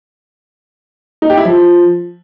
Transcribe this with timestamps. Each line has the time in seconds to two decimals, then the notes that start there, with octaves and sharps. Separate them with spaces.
1.22 D#4
1.30 G4
1.37 E4
1.45 F3